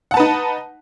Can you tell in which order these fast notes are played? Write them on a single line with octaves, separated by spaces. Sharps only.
F#5 A5 B4 D#4